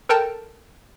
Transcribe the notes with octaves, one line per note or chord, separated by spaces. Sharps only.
A4 A#4 G5 A5